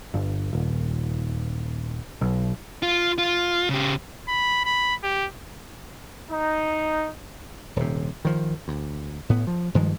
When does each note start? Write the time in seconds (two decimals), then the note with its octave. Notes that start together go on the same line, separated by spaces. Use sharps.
0.14 G1
0.53 D#1
2.21 B1
2.83 F4
3.18 F4
3.70 C#3 G4
4.29 B5
4.65 B5
5.03 G4
6.30 D#4
7.76 D#1 C3
8.25 D#3 F3
8.68 D2
9.29 A2 B3
9.47 F3
9.74 G2 D#3 F3 G#3